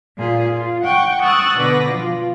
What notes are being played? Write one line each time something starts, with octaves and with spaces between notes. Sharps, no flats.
A#2 F4 G#4
F4
F#5 G5 C#6 G6
C#6 D#6 E6 F#6 A6
B2 D3 B3 B4 D6 A#6
F3 F4